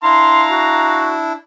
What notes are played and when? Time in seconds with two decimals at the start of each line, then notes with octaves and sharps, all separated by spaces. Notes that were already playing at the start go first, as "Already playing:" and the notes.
0.03 D4 E4 F5 A#5 C6
0.51 F#4